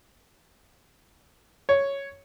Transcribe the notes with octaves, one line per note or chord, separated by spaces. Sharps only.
C#5